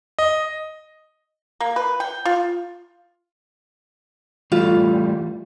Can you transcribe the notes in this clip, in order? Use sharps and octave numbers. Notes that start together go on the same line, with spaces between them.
D#5
A#3
B4
G5
F4
E3 G3 A3 F4